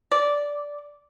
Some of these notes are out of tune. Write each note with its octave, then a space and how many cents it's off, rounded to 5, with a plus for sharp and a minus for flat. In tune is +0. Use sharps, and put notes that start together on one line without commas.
D5 -10